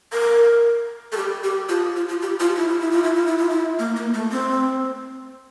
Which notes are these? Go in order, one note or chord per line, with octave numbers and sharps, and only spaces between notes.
A#4
A4
G4
G4
F4
F4
F4
G4
F4
E4
F4
E4
F4
E4
F4
E4
F4
E4
A#3
A#3
A3
C4